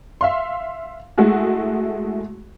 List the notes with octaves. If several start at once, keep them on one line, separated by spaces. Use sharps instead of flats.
E5 F5 C6
G#3 A3 E4 F#4 G#4